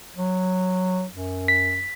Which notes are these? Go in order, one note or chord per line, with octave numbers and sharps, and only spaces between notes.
F#3
F#2
B6